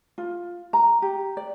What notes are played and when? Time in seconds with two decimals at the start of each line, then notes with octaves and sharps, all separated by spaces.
0.18 F4
0.73 A#5
1.02 G4
1.37 D5